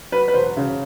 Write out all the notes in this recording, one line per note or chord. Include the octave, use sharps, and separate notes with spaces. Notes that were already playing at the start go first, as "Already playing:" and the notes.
F#3 B4
B4
E1 C5
C#3